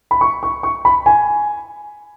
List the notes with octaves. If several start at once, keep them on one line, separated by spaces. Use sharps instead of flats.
B5
C#6
C#6
C#6
B5
G#5